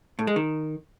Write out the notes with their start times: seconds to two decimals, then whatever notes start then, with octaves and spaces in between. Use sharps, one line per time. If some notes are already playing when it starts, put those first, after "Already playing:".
0.19 A2
0.27 G#3
0.36 D#3